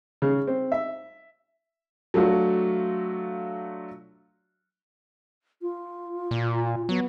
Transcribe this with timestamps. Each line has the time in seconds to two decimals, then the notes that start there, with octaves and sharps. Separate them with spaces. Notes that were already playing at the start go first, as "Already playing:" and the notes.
0.22 C#3
0.47 C4
0.72 E5
2.14 F#3 A3 D4 F4 F#4
5.62 F4
6.31 A#2
6.89 F#3 B3